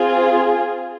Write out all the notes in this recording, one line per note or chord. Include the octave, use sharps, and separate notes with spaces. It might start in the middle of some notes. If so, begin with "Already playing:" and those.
Already playing: C4 F4 G#4